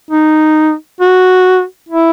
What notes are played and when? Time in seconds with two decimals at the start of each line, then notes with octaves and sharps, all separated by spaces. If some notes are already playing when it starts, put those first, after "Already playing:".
0.11 D#4
1.01 F#4
1.89 E4